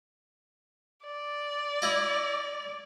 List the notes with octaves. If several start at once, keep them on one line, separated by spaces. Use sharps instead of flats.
D5
E4 D#5